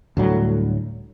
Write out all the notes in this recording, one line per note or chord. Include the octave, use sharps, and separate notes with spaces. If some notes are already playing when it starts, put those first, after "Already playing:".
D2 A2 F#3 G3